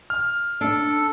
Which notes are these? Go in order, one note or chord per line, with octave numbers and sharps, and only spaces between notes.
F6
D4 A4